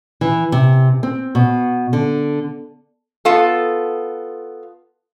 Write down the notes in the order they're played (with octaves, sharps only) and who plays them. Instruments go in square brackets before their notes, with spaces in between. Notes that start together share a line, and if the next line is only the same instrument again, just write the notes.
[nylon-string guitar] E3
C3
C4
B2
D3
[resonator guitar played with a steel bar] B3 F4 A4